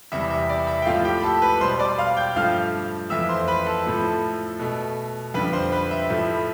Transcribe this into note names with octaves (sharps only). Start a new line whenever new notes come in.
E2 C3 G3 E5
E5
D5
E5
G5
A2 F3 A3 F4 F5
G4 G5
B5
A4 A5
B4 B5
B2 G3 C5 C6
D5 D6
F5 F6
G5 G6
G2 F3 A3 F5 F6
F2 E3 A3 E5 E6
C5 C6
B4 B5
A4 A5
A2 F3 A3
B2 A3
F2 D3 G3 B4 B5
C5 C6
B4 B5
E5
A2 F3 A3